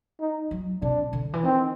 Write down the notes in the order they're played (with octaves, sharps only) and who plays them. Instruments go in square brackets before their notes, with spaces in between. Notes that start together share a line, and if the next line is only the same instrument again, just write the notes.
[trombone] D#4
[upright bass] F#3
[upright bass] C3 [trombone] D4
[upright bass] D3
E3
[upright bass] D#3 [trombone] C4